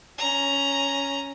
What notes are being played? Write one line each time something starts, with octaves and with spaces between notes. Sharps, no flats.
C#4 A#5